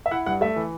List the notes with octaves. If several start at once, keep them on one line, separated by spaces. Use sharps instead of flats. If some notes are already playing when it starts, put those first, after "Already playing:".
E5
E4 F#5
G2 F#5
A3 E5
E3